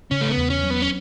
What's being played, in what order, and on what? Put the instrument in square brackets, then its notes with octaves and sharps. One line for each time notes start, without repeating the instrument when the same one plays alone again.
[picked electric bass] C#3 [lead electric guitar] C#4
[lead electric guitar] A3
B3
[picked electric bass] E2
[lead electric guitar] C#4
[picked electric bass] F#3
[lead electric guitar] B3
C#4